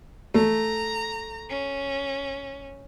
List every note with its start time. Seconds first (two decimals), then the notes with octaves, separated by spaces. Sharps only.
0.34 A3 A#5
1.50 C#4